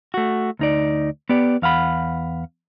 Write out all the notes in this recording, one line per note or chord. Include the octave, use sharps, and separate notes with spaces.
A3 F#4
D2 D#4 D5
B3 G4 D5
E2 F5 F#5 B5